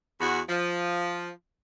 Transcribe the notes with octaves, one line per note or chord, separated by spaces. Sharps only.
E2 F#4
F3